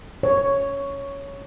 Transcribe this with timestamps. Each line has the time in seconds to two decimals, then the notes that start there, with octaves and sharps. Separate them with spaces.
0.23 C#5